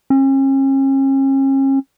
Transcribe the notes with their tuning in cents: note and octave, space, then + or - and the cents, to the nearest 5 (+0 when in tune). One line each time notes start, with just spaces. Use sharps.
C#4 -40